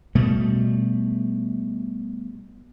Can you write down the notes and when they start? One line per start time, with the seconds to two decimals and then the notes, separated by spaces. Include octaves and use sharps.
0.15 B2 G3 A3